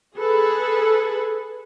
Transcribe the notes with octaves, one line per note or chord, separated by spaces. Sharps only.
G#4 A4 B4